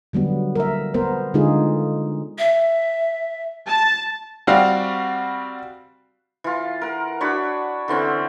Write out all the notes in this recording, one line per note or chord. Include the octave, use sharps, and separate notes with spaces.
D3 F#3 G3 B3
A#4 E5
B3 A#4 C5
D3 G#3 D#4 F4 G#4
E5
A5
G3 C4 F#4 D5 F5
E3 F4
A#4 F#5
D4 F#4 C#5 B5
D3 E3 C4 C#4